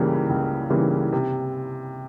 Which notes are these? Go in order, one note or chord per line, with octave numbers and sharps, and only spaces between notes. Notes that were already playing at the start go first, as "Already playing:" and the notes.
Already playing: C#2 C#3 E3 G3 A#3
C#2
C#3 E3 G3 A#3
C3